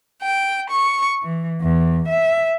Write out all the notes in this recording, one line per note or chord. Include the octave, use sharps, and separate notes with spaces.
G5
C#6
E3
E2
E5